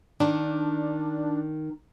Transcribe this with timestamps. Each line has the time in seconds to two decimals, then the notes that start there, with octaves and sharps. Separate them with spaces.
0.20 D#3 D4